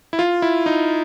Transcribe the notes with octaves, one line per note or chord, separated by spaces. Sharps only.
E4
F4
E4
D#4